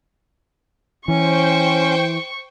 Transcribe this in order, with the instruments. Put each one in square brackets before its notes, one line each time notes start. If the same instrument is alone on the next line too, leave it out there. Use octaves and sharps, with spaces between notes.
[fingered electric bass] E3 [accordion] C#4 [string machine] C5 G5 [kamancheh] C#6